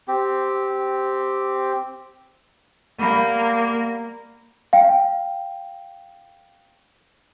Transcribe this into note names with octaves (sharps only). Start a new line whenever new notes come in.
C4 G4
G3 A#3 B3
F5 G5